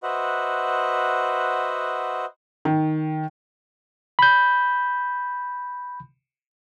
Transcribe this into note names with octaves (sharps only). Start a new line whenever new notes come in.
F#4 B4 C5 D#5 E5 F#5
D#3
B5 G6